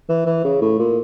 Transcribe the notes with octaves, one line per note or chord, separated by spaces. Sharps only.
E3
E3
C#3
A2
A#2